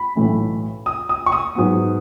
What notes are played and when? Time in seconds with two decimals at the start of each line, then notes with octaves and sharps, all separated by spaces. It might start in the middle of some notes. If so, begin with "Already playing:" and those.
Already playing: B5
0.15 B1 A2 E3 A3 C#4
0.86 D#6
1.09 D#6
1.26 C#6
1.32 D#6
1.55 G#2 F#3 B3